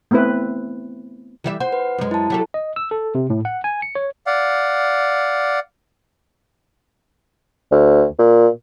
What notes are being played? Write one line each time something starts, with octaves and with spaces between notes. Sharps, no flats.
A3 B3 C4 E4 B4
E3 G3 E5
C5 F#5
B4
F#2 G#3
E4 A5
F#3 G4 A4
D#5
E6
A4
C3
A2
F#5
G#5
C#7
C#5
D5 F5 F#5
D2
A#2